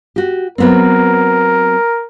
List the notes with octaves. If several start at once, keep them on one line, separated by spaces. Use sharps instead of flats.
F#4 G4
F#3 B3 C4 A#4